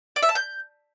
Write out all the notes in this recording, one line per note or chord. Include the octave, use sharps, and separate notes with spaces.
D5
E5
A5
G6